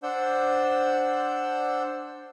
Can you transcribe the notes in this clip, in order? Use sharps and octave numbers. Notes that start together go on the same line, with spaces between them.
D4 C5 D5 F#5 E6 G6